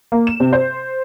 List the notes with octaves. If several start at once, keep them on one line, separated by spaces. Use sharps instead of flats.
A#3
E7
C3
C5